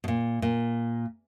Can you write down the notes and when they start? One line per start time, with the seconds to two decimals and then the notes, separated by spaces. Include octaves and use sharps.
0.04 B2
0.08 A#2
0.42 A#2